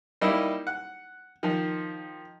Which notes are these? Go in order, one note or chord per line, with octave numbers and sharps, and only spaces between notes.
G3 A#3 D#4 E4
F#5
D#3 F3